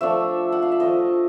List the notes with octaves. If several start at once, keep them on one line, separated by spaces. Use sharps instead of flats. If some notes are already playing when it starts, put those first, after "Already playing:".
F3 A3 D4 E5
F#5
F5
E5
F3 A3 D4 D#5